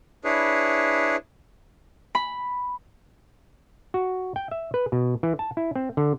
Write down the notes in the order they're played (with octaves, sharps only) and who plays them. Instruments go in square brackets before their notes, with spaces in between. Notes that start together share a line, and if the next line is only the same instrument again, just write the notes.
[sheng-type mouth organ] D4 E4 G#4 B4 C#5
[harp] B5
[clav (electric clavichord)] F#4
G5
E5
B4
B2
E3
A5
E4
C4
D3